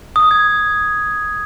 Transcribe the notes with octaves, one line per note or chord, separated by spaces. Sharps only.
D#6
G#6